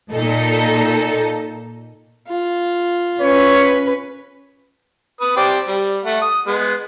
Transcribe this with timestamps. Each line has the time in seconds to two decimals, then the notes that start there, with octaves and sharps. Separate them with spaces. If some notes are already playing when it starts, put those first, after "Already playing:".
0.13 A#2 D#4 A4
2.28 F4
3.20 C#4 B4 C#5
5.21 B4 D#6
5.37 C4 G4 D5
5.68 G3
6.05 A3 F#5
6.22 D#6
6.47 G#3 B3